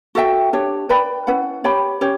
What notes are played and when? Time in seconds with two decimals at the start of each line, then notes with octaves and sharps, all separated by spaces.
0.15 F#4 A4 E5 G5
0.53 D4 G4 C#5
0.89 B4 D5 G5 B5
1.27 C#4 E4 B4 F#5
1.64 G4 C#5 G5 B5
2.01 C#4 G4 C#5